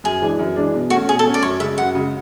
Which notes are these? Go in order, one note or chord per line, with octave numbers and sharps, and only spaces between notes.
F#2 G#4
E3 G#3 D4
F#2
E3 G#3 D4
B2
A3 C#4 F#4
B2 G#4
A4
A3 C#4
D5
F#2 C#5
C#3 G#3 E5
F#2 F#5
C#3 G#3